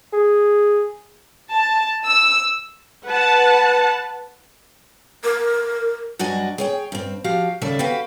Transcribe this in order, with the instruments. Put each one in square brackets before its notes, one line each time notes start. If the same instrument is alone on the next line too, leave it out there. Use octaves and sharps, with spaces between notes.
[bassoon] G#4
[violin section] A5
E6
[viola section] B4 F#5 A5
[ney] A#4
[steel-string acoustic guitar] G2 F#3 D4 F#4 D#5 G#5
G#4 C#5 G5
G2 C4
F3 F#4 G4 F5
D#2 C#3 G3 A3 D5 E5
F#4 G4 B4 F5 G5